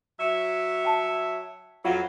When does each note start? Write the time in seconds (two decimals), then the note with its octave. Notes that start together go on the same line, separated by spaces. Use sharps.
0.20 F#3 C#5 E5
0.85 G5 A5
1.85 F2 F#3 F4 F5 F#5